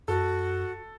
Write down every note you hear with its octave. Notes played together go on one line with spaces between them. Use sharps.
F#2 F#4 A4